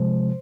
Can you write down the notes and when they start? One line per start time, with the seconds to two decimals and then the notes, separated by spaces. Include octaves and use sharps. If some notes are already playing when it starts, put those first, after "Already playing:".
Already playing: C3 F3 G#3 C5